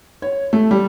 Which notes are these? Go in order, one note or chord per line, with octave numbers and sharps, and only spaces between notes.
C#5
A3
G3